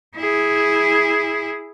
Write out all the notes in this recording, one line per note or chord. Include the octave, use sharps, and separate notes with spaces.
E4 G#4